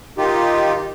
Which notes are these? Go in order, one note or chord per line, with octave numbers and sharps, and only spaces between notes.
D#3 D#4 F4 G4